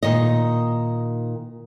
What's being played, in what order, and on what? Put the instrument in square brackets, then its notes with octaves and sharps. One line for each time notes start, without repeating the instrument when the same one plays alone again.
[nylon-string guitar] A#2 D#3 D#5